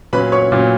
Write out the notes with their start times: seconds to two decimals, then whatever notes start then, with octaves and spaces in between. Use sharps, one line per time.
0.13 A#2 F#3 C#4 B4 B5
0.32 C#5 C#6
0.52 A#2 F#3 C#4